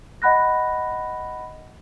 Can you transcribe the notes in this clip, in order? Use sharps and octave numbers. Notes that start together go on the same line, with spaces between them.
D#5 F#5 B5 F#6 A#6